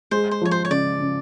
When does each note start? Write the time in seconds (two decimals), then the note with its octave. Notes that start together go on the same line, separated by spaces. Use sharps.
0.11 G#3 C5
0.31 C5
0.42 F3 C#5
0.51 C5
0.65 C#5
0.70 C#3 D5
1.01 C#3